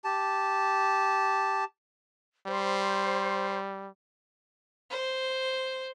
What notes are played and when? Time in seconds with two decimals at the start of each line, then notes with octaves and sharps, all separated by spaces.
0.04 G4 A5
2.47 G3 C5
4.90 C5